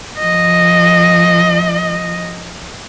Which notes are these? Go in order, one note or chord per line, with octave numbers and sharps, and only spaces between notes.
F3 D#5